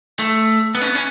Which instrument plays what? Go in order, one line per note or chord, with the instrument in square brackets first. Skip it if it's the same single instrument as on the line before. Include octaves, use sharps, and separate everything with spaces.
[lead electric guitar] A3
B3
C#4
B3
C#4